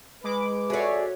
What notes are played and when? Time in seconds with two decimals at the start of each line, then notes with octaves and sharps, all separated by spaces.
0.24 G#3 B4 B5 D6
0.70 F2 F#4 G#4 A4 C#5 D5 E5